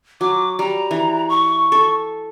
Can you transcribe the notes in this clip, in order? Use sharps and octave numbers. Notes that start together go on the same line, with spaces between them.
F#3 D6
G3 A#5
E3
C#6
A4